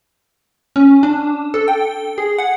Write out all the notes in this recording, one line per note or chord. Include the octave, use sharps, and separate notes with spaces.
C#4
D4
A4
G5
G#4
F#5